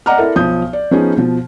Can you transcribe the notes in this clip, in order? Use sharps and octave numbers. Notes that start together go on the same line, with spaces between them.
D5 D#5 F#5 A#5 D6 F6
E4 A4 A#4 D5 E5
B1 F3 D#6 G6
D5
F3 B3 C#4 D#4 G#4
B2 F3